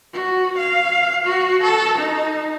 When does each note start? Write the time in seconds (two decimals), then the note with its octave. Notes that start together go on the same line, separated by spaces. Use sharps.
0.13 F#4
0.58 F5
1.25 F#4
1.63 A4
1.98 D#4